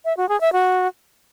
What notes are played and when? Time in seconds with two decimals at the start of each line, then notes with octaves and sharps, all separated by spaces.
0.05 E5
0.17 F#4
0.29 G#4
0.41 E5
0.53 F#4